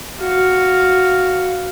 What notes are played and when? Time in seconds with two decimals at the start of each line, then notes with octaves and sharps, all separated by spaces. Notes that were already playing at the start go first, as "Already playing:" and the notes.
0.21 F#4 F5